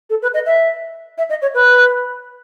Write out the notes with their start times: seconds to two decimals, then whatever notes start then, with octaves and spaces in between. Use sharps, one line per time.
0.10 A4
0.22 B4
0.34 D#5
0.46 E5
1.18 E5
1.29 D#5
1.42 C#5
1.54 B4